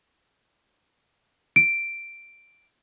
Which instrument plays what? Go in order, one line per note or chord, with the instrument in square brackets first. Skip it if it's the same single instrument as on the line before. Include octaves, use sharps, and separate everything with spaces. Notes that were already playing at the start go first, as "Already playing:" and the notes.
[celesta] D7